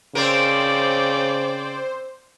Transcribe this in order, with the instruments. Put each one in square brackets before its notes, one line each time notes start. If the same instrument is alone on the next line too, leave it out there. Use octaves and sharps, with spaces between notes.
[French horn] C#3 [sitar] C4 A#4 [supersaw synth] C5 [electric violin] D5 G5